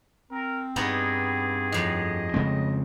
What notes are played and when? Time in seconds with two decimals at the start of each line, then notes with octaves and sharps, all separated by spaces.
0.31 C4 A#4
0.76 G2 B3 D#4 G#4 D#5
1.72 F2 A2 D#5
2.34 C#3 G#3 C4